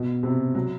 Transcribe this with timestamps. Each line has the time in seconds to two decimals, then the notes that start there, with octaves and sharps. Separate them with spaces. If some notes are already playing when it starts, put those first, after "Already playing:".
Already playing: B2
0.23 C3
0.55 F#3